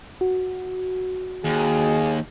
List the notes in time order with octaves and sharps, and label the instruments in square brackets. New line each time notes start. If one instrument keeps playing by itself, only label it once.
[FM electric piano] F#4
[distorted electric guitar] D#2 [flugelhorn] G#4